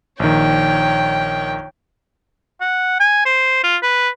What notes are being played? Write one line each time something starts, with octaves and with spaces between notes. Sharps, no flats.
A#1 D#3 C#5 G5
F#5
G#5
C5
F4
B4